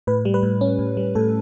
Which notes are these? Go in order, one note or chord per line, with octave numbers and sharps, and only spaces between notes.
A2 B4
G3
B4
A2
C#4
A2
G3
A2 A4